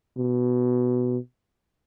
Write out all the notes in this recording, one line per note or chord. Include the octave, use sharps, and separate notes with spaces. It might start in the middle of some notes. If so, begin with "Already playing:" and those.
B2